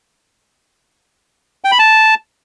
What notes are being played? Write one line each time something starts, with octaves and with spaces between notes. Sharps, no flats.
G5
B5
A5